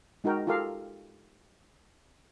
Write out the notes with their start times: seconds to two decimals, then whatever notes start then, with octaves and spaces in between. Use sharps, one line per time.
0.24 G#3 D#4 F#4 A#4 G5
0.47 F4 G4 A4 A#4 F5